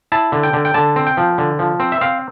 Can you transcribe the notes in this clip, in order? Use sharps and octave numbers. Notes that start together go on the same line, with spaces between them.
E4 A5
D3
G5
D3
G5
D3 A5
C4
G5
F3
D3
F3
C4
E5
C4 F5